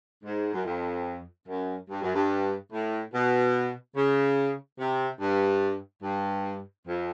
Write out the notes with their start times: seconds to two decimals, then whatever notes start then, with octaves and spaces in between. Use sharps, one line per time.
0.24 G#2
0.53 F#2
0.65 F2
1.47 F#2
1.89 G2
2.02 F#2
2.14 G2
2.72 A2
3.14 B2
3.96 C#3
4.79 C3
5.20 G2
6.03 G2
6.86 F2